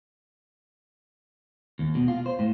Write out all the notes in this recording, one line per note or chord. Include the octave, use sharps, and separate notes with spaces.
D#2
B2
F4
C5
A2